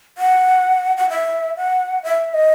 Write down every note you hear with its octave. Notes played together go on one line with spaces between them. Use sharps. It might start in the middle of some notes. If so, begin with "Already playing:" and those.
F#5
F#5
E5
F#5
E5
D#5